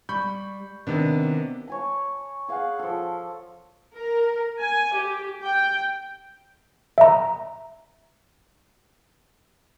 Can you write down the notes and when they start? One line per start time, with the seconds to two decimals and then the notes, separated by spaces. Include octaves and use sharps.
0.09 G3 B5 C#6 G6
0.87 C3 D#3 B3 D4
1.68 C#5 G#5 A5
2.49 G#4 F5 F#5 G#5
2.79 F3 A4
3.94 A#4
4.59 G#5
4.95 G4
5.44 G5
6.98 E5 A#5